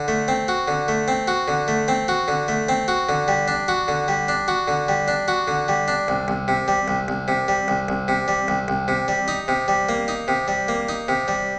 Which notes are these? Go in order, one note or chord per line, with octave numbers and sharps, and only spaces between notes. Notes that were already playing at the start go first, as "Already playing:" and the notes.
Already playing: D3
A3
C4
F#4
D3
A3
C4
F#4
D3
A3
C4
F#4
D3
A3
C4
F#4
D3
G3
D4
F#4
D3
G3
D4
F#4
D3
G3
D4
F#4
D3
G3
D4
C2
C2
C3
G3
C2
C2
C3
G3
C2
C2
C3
G3
C2
C2
C3
G3
D#4
C3
G3
A#3
D#4
C3
G3
A#3
D#4
C3
G3